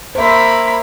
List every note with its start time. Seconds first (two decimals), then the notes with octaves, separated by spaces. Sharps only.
0.15 A#3 C5 E5 B5